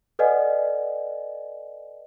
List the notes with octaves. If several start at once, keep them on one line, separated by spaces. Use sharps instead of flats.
A4 B4 D5 D#5 F#5 G#5